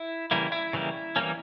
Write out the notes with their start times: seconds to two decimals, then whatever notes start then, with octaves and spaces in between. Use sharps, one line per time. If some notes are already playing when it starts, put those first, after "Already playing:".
Already playing: E4
0.31 C#3 E3 G3 A#3 E4
0.52 E4
0.73 C#3 E3 G3 A#3
1.16 E3 G3 A#3 C#4